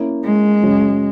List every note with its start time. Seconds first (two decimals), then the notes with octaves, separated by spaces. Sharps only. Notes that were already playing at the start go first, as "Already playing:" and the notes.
Already playing: A#3 C#4 E4
0.24 G#3
0.63 F#2 C#3 F#3 C#4